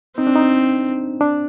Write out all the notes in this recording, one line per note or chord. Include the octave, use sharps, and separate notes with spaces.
C4 D#4
D4
D#4
D4